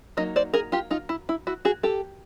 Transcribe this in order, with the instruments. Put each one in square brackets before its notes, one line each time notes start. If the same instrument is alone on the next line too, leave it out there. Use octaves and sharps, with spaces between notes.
[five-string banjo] F#3 A#3 D#4 D#5
C5 D5
G#4 A#4
F4 G4
D#4 F4
E4
E4
E4 F#4
F#4 G#4
G4 A4